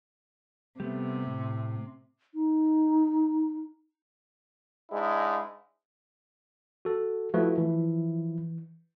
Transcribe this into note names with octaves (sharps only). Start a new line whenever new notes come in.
C3 G3 A3 B3
A2
D#4
G#2 G#3 D4 E4
F#4 A4
F3 A3 E4 F#4 B4
E3